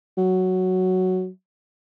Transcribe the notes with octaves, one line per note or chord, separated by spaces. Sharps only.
F#3